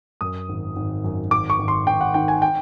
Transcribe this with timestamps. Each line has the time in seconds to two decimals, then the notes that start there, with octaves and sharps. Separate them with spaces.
0.21 F#2 D#6
0.49 G#1
0.76 G#1
1.04 F#2
1.31 G#1 D6
1.50 C#6
1.59 G#1
1.68 C6
1.87 G#1 G5
2.01 F#5
2.14 D#3 G5
2.28 G#5
2.42 G5